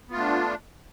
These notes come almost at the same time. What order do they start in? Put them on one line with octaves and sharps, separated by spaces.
B3 F4 A3 D4